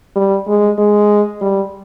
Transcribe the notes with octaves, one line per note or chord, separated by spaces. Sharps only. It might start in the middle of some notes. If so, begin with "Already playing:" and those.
G3
G#3
G#3
G3